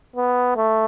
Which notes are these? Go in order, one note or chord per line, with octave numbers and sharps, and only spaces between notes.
B3
A3